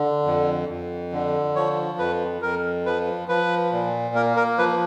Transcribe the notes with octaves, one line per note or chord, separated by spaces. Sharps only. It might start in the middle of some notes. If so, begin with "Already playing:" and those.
Already playing: D3
F2
F2
D3
F3 C#5
F2 B4
F2 A#4
F3 B4
F3 B4
A#2
A#3 A#4
A#4
F3 B4